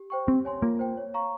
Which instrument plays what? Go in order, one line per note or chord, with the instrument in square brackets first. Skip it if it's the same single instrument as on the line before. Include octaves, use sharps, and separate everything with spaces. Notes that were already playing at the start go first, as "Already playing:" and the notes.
Already playing: [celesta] G4
C5 G5 C#6
[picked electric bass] C4 [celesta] G4
[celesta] C#5 G#5 C6
[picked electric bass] A#3 [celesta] F4
[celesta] C5 G5
C#5
F5 A#5 C#6